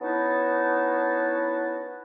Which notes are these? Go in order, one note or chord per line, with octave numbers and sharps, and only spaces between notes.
B3 C#4 D#4 E4 F#4 A5